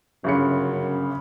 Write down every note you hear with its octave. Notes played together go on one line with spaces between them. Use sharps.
G1 F#2 C#3 C#7